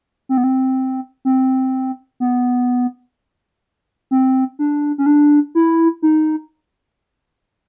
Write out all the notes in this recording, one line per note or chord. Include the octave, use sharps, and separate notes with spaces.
C4
B3
C4
C4
B3
C4
D4
C#4
D4
E4
D#4